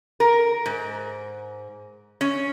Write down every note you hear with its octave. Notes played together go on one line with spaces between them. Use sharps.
A#4
G#2
C#4